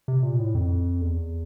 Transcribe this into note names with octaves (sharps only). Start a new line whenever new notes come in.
C3
A#2
A2
F2
E2